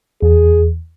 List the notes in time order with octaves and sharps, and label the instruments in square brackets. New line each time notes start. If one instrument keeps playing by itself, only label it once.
[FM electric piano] E2 [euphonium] G#4